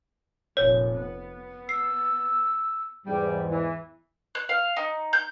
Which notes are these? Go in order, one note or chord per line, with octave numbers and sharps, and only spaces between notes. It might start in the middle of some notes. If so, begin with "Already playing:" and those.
F1 A#2 C#5
B3
E6 C7
E2 G#2 G3
E3
F#6
F5
D#4
G6